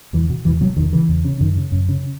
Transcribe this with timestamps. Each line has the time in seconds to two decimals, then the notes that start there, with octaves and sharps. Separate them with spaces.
0.13 E2 E3
0.29 B2
0.45 E2 E3
0.61 B2 F#3
0.76 E2 D#3
0.92 C#3 E3
1.09 E2
1.24 C#3
1.40 F#2 D#3
1.57 C#3
1.72 F#2
1.89 C#3